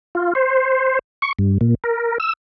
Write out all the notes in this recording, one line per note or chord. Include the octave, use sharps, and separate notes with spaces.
F4
C5
C#6
G2
A#2
A#4
E6